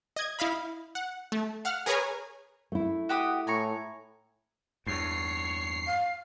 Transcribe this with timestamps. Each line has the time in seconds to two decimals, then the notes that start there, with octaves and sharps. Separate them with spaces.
0.16 D#5 G#6
0.39 E4 D#5 F5 B5
0.95 F#5
1.32 A3
1.65 F5 F#5 F6
1.86 G#4 A#4 B4 C#5 G#5 A#5
2.72 A3 E4
3.09 F#4 G4 D#6
3.47 A2 G#5 A#5 C#6
4.87 E2 G2 C#5 C7
5.87 F5